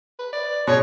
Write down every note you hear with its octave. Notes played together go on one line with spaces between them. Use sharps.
B4
D5
B2 G#4 C#5